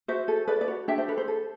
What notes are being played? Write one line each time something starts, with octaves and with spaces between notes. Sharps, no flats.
F#4 C5 E5
A4
A4 B4 D5
B4 D5
F#4
D4 E5 G5
C5
A4 B4
C5
A4